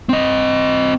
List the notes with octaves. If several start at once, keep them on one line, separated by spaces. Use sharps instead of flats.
C4 D#5